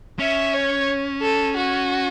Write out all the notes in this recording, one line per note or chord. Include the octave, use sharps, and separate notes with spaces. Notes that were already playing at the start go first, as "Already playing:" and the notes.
C#4 E5
C#5
A4
F#4